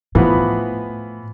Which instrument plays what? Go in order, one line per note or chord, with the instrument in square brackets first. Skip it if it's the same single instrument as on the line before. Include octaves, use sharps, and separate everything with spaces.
[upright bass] A2 [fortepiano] E3 F3 B3